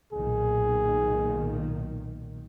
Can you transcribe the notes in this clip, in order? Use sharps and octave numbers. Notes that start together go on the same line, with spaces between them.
B1 A#2 D#3 G#4